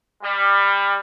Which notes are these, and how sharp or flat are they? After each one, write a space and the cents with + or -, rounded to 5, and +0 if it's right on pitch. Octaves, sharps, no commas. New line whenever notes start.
G3 +25